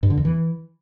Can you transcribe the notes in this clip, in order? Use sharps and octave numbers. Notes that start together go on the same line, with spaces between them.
G2
D3
E2
E3